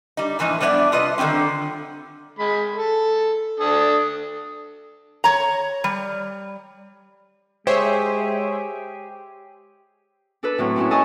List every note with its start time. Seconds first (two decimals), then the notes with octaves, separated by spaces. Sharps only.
0.17 G3 D#4
0.39 A2 E3 F3 A#3 D#4
0.61 G3 B3 D4 C#5 D5 E5
0.92 C3 F4 B4 D#5
1.18 D3 D#3 G3 C4 C#4
2.39 G#3 B5
2.75 A4
3.60 D4 A4 D#6
5.24 C#5 A#5
5.84 G3
7.67 G#3 G4 G#4 C5 C#5 E5
10.43 D4 A4 B4
10.58 A2 F#3 C4
10.76 F#2 A#2 C#4 E4
10.91 A4 D#5 G#5 A5 C#6 D#6